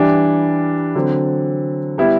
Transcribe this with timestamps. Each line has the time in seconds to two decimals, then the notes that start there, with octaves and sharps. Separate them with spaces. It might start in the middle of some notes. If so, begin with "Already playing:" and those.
Already playing: E3 G3 D4
0.95 D3 F#3 C4
1.98 G3 B3 E4